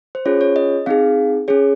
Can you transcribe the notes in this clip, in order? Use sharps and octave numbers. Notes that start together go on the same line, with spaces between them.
C5
C#4 F4 G#4 C#5
C#5
D#5
C4 D#4 G#4 F5
C#4 G#4 C#5